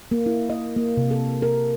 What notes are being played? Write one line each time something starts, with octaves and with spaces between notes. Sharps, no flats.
A#3
E4
D#5
A#3
C3
A4
A#4